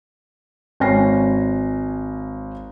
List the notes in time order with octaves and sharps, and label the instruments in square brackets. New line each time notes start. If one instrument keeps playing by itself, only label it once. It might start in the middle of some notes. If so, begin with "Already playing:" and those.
[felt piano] G#1 C#5 G#5 A#6 C7